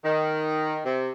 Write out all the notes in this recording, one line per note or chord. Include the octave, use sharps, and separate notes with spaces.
D#3
C3